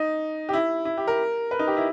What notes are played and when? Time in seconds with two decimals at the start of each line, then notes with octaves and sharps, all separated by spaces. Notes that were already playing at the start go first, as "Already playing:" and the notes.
Already playing: D#4
0.49 G4
0.53 E4
0.85 E4
0.97 G4
1.07 A#4
1.51 B4
1.59 D#4
1.67 G4
1.77 E4